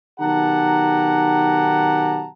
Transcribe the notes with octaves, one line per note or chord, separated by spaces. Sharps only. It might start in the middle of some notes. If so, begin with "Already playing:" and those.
B1 D#3 G4 F#5 A5 A#5